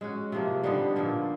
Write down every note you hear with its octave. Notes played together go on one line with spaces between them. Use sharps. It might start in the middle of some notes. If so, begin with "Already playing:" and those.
G#3 C#4 F#4
C3 F3 A#3
D3 G3 B3 D#4
A#2 F3 A#3